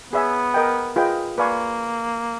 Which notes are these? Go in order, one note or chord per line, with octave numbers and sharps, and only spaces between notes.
B3 G#4 C#5 E5 G#5
A#4 D#5 G5
F4 G#4 B4 D#5 G5
A#3 B4 D5 F5 G#5 C#6